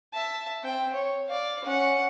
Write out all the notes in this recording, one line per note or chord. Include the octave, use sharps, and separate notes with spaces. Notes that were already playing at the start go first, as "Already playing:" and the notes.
E5 A5
C4 G5
C#5
D5 F5
C#4 F#5